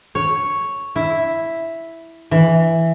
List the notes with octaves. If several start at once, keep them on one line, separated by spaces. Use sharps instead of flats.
C#5
E4
E3